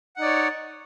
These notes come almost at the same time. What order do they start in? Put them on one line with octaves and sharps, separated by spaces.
F#5 D#4 D5 C#5